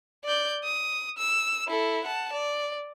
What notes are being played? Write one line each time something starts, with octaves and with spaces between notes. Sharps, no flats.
D5 G6
D#6
E6
E4 A4
F#5 A5
D5